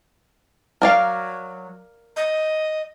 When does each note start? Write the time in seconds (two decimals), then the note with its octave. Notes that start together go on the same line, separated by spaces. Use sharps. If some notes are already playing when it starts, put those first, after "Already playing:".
0.82 F#3 A#4 D5 F5
2.16 D#5